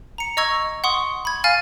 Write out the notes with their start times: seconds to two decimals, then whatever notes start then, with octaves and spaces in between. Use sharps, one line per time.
0.18 A#5 C#7
0.37 D#5 A#5 C#6 E6 G#6
0.84 F#5 C6 C#6 D#6
1.25 B5 G#6
1.44 F5 G#5 F6 A6